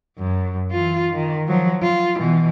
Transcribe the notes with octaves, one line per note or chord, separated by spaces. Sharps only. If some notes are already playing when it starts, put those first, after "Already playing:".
F#2
E3 F4
D#3
F3 F#3
F4
B2 E3